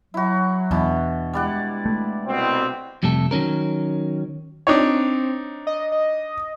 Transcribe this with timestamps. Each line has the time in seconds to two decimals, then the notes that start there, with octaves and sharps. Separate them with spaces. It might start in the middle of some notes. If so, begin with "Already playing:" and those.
0.14 F#3 E4 F#4
0.71 E2 B2 E3 D4
1.33 G3 G#3 E4 D5 F#5
1.86 A3
2.26 C2 B2 C4
3.03 F2 C3 G3 A3 A4
3.31 D#3 F#3 C#4 A#4
4.67 C4 D4 D#4 C#5
5.67 D#5
5.92 D#5